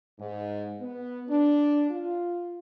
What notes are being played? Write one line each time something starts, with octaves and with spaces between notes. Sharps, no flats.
G#2
B3
D4
F4